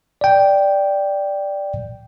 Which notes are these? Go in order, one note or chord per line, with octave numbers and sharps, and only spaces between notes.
D5 G5